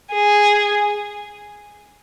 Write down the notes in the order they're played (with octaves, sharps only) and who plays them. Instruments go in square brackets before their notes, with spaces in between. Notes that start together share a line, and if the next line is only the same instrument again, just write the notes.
[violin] G#4